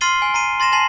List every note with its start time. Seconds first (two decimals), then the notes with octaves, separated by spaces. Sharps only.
0.01 C6 F6 A6 C7 D#7 G7
0.22 G#5
0.34 A#5 C7 D#7
0.60 C6 A6 A#6 E7
0.72 G#5 A5 A6 C7 F#7